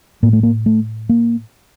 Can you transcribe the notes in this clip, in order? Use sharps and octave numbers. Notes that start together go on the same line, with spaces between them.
A2 A#3
A3
A#3
A3
A#3